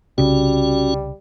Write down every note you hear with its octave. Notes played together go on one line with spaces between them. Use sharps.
C2 C#3 G3 C#4 F#4